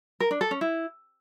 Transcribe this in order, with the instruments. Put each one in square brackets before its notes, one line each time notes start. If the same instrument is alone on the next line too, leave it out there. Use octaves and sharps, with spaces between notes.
[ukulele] A#4
D4
A4
C#4
E4